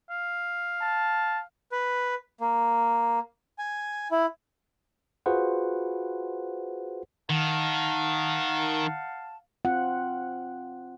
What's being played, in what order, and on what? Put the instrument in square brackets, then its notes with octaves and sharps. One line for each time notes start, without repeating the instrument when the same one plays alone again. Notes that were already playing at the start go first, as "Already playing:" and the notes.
[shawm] F5
[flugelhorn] A5
[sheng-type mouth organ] B4
A#3
G#5
E4
[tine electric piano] F4 F#4 G#4 B4 C5 F#5
[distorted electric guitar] D#3 [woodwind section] F5 F#5 A5
[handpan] C4 F4 F#5